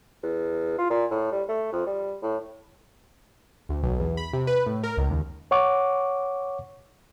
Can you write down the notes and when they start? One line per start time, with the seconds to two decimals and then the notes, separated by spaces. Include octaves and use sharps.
0.23 E2
0.78 F4
0.90 A#2
1.11 A2
1.32 G3
1.48 A3
1.72 F2
1.86 G3
2.23 A2
3.69 D2
3.83 B1
4.00 E2
4.17 B5
4.33 C3
4.47 B4
4.66 A2
4.84 A#4
4.97 C#2
5.11 D#2
5.51 C#5 F#5 C#6 D6